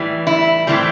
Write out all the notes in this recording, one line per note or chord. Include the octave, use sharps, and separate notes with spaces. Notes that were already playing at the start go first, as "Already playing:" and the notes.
Already playing: A2 E3 G3
E4
A2 E3 G3 C4